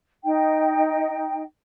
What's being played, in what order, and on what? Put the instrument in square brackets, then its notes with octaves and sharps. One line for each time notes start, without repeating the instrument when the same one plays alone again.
[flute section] D#4 G5